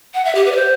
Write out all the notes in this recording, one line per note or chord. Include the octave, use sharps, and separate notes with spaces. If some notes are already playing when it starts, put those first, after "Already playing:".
F#5
E5
G4
B4
D5
C5